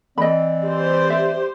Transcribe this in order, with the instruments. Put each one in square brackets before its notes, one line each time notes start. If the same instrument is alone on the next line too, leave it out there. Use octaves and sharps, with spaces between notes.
[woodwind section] E3 C4 D5 [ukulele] D#5 B5
[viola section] G4 C5
[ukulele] E5